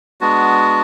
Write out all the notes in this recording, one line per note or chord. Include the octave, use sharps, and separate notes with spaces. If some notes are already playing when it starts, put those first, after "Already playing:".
G#3 B3 D4 F#4